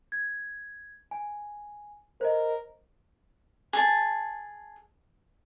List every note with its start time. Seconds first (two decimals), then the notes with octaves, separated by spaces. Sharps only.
0.12 G#6
1.11 G#5
2.21 A#4 C5 D#5
3.73 G#4 A5